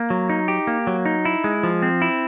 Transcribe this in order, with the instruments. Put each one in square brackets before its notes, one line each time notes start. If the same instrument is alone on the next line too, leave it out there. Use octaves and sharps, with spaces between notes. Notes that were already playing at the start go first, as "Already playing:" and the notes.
Already playing: [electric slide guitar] A#3
F#3
D#4
G4
A#3
F#3
D#4
E4
G#3
F3
C4
E4